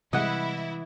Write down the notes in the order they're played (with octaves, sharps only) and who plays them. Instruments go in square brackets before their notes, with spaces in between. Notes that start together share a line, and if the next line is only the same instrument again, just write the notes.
[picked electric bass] C3 G3 G#3 [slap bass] E3 [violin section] E4 [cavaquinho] D#5 F#5